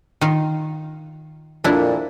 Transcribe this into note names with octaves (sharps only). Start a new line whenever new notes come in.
D#3 F4
F2 A#2 D4 E4